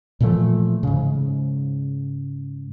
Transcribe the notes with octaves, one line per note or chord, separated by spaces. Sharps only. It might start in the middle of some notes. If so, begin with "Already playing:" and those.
A#2 E3 F3 A3
G#2 C#3